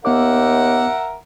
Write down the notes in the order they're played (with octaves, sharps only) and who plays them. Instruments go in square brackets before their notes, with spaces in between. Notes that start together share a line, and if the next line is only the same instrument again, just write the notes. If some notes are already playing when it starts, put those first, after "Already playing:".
[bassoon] D#2 [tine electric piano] B3 D6 [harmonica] A#4 E5 F#5